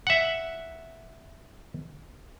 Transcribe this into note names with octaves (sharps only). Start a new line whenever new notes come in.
E5 F#5